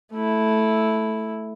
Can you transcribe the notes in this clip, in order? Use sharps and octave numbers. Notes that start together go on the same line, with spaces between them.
A3 E4